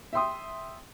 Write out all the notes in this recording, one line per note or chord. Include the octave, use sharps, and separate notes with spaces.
E5 G5 C6 D#6